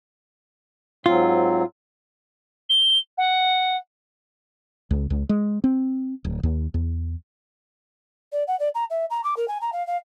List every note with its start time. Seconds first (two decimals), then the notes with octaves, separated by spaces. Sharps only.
1.06 G#2 F#3 C4 F4
2.69 G7
3.18 F#5
4.91 C#2
5.10 C#2
5.29 G#3
5.64 C4
6.24 D1
6.43 D#2
6.74 E2
8.32 D5
8.47 F#5
8.60 D5
8.75 A#5
8.90 E5
9.10 A#5
9.24 D6
9.37 A#4
9.48 G#5
9.61 A#5
9.73 F5
9.87 F5